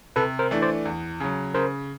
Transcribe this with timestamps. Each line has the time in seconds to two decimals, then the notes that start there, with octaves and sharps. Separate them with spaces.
0.16 C3 A4 B4
0.39 A#4 C5
0.51 E3 A3 D4
0.62 C5 D5
0.85 E2
1.20 C#3 F#3
1.54 C#3 A#4 C5